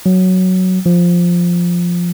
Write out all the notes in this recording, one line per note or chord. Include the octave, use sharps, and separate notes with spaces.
F#3
F3